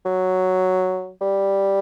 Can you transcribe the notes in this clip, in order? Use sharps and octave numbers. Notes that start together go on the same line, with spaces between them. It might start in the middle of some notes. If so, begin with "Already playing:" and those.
F#3
G3